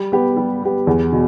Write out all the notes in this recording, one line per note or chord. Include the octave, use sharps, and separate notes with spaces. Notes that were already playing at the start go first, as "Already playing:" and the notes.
Already playing: G3
B3 G4
G3
B3 G4
E2
B2